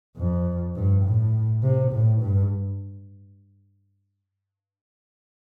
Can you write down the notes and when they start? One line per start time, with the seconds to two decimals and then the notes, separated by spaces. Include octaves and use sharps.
0.17 F2
0.75 G2
1.04 A2
1.63 C3
1.92 A2
2.21 G2